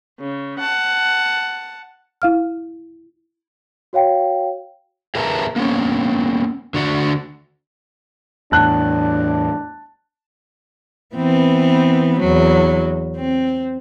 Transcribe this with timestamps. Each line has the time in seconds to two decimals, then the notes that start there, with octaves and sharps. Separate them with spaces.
0.21 C#3
0.60 F#5 A5
2.22 E4 F5 F6
3.93 F#4 C#5 F5 G5
5.15 G#4 A#4 B4 E5 A5 A#5
5.56 A#3 B3 C#4
6.74 D3 F#4 D5 F#5
8.52 E2 A2 D4 A5 F#6
11.15 E3 B3 C4
12.20 E2 F#3
13.17 C4